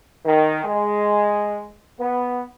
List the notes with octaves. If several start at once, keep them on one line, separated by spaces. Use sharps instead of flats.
D#3
G#3
B3